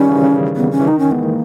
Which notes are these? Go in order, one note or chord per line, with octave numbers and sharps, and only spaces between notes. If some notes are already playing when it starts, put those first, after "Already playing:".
Already playing: D#3 G3 C#4
C#3 E3
C#3
B3
C#4
E3
D#3 D#4
C#4
E3 G#3 B3
A#3